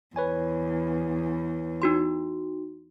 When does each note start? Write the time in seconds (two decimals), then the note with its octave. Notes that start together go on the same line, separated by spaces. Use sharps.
0.16 E2 B4 C#5 G#5
1.82 D#4 F#4 C6